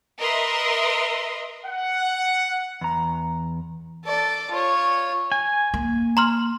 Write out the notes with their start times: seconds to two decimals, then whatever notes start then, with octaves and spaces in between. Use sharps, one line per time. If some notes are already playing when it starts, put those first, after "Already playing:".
0.19 A#4 B4 D#5 E5 C6
1.65 F#5
2.81 E2 A#5
4.05 A4 D5
4.51 F4 C#5
5.32 G#5
5.74 A#3
6.17 A#5 C6 F6